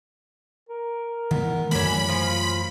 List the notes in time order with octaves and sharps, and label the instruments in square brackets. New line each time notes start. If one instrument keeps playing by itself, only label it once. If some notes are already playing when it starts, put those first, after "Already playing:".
[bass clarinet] A#4
[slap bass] D#3 E3 G#3 [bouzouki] B3
[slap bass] F#2 E3 A3 [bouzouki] D3 C#4 [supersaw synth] B5
[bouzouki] F3 F4